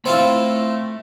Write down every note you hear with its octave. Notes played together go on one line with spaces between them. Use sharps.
A3 C4 E4 F4 B5